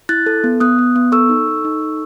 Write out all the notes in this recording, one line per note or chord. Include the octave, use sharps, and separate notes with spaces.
E4 F#6 A6
A4
B3
B3 D#6 F#6
B3
B3
A4 C#6 E6
D#4
A4
D#4
A4